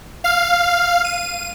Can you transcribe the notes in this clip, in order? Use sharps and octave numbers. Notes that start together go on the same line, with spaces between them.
F5
D#7